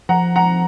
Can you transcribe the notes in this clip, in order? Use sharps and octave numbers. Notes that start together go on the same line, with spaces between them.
F3 F#5 A#5
F#5 A#5